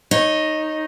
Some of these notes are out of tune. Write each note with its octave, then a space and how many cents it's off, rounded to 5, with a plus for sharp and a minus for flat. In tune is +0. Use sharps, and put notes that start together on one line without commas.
D#4 +0 C#5 -20